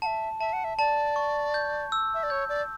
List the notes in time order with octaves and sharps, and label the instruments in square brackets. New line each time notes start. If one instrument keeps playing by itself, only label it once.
[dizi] E5 F#5 [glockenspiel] A5
[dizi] E5 [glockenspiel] A5
[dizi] F#5
E5
[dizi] D5 [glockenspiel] A5
[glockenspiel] C#6
G6
E6
[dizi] E5
D5
[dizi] C#5 [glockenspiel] G6
[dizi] D5